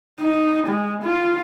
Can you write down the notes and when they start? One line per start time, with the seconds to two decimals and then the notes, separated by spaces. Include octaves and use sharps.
0.20 D#4
0.67 G#3
1.03 F4